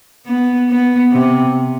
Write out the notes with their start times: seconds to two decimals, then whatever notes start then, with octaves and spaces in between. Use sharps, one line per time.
0.27 B3
0.69 B3
1.12 C3